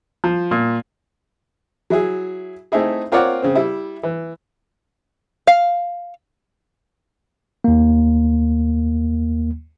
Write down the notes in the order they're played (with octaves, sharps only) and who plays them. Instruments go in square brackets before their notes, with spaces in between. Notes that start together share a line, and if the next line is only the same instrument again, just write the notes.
[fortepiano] F3
A#2
F#3 E4 G#4
A3 C4 D#4 E4 G#4
C4 F4 A#4 C#5 D5 F#5
C#3 C4
G3 E4
E3
[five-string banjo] F5
[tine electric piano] D#2 A#3